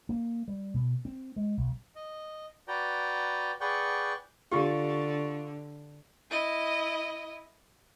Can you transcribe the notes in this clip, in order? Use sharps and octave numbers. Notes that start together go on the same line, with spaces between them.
A#3
G3
B2
C4
G#3
B1
D#5
F#4 B4 D5 G5 A#5
G#4 B4 D5 F#5 G5 C#6
D3 F4 G4 C#6
E4 D#5